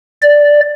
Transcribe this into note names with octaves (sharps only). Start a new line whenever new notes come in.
D5